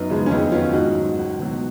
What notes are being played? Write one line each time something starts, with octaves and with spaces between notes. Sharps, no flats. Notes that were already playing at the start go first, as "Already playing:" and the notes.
Already playing: F#2 B3 D#4
C#3 F3 G#3
C#4
F2 B3 D#4
D#3 F#3 C#4 F4
G#2 D#4 F#4
F#3
C#2
B2 F#3